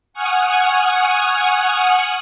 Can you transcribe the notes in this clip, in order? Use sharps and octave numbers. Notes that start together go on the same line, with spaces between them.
F#5 G#5 C#6 D#6 F6 F#6